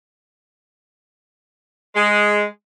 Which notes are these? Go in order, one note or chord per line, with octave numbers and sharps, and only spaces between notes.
G#3